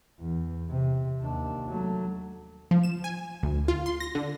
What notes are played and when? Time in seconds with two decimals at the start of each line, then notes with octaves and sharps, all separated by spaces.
0.20 E2
0.70 C3
1.20 D#2 D4
1.67 F#3 A3
2.71 F3
2.83 E7
3.04 G#5
3.43 D2
3.68 F4
3.86 C6
4.00 A#6
4.15 D3